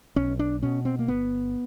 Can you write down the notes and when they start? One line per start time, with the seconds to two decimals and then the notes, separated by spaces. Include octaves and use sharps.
0.16 B1 C#4
0.39 D4
0.63 B2 C#4
0.85 C4
0.99 A#3
1.08 G1 B3